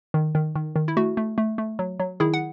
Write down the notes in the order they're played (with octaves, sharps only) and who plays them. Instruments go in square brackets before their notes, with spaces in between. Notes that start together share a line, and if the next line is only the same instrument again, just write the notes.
[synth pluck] D#3
D#3
D#3
D#3
E4
A3 F#4
A3
A3
A3
F#3
F#3
D#3 E4 G#4
F#5